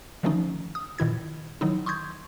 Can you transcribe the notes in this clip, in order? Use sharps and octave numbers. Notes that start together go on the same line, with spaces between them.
D3 D#3 F3 A3 C#4 D#4
D#6
A#2 D#3 E4 G#6
D#3 F#3 D#4 E4
C6 C#6 D#6 G6 G#6